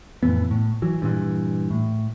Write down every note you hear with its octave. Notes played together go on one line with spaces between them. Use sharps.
F2 A2 E3 B3
A2
E3 F#3
G2 A#2 E3
A2